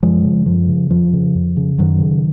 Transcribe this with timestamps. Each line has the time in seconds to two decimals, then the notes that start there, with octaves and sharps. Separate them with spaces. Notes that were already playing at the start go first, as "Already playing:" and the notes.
0.03 F#2 F3 G#3
0.24 C#3
0.46 F#2 F3
0.68 C#3
0.90 F2 F3
1.13 C#3
1.35 F2
1.57 C#3
1.78 F#2 D#3 F#3
2.00 C#3